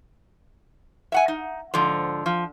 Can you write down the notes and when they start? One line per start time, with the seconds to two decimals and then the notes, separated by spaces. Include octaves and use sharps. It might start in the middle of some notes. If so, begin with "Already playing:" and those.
1.12 E5 F#5 G#5
1.28 D#4
1.74 G#2 D3 F3
2.26 F3